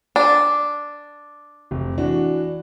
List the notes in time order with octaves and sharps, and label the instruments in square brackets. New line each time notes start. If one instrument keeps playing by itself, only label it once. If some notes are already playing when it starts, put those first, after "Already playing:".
[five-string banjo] D4
[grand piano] F1
E3 D4 F#4